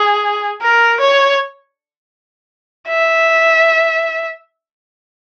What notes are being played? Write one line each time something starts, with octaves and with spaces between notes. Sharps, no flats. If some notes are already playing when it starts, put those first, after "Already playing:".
Already playing: G#4
A#4
C#5
E5